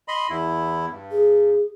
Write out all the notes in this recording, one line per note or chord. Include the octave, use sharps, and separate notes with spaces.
D#5 B5 C6
E2 E4
G2
G#4